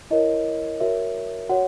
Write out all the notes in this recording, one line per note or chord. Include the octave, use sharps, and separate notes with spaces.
E4 A#4 C#5 D#5
F#4 A#4 C#5 E5
F#4 C#5 F#5